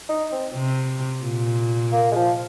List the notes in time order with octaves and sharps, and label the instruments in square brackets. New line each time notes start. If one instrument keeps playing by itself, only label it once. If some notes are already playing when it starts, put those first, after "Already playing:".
[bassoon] D#4
C4
[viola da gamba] C3
A#2
[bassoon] A#3
G#3
F3